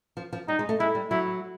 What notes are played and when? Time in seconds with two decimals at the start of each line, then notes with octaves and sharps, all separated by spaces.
0.17 F3
0.33 F3
0.48 G3 D#4
0.59 G#3
0.69 A3
0.79 G#3 E4
0.95 G3
1.10 F#3 E4